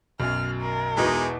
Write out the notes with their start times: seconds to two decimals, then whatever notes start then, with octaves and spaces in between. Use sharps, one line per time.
0.20 B1 F#2 F6
0.62 A#4
0.97 E2 B2 E3 G#3 B3 D#4